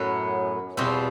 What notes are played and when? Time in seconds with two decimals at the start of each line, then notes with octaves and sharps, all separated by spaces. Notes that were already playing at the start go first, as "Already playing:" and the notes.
Already playing: F#2 A2 F#3 B3
0.77 E2 B2 G3 C4 F4